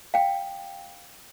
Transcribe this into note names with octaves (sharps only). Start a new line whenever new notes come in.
F5 G5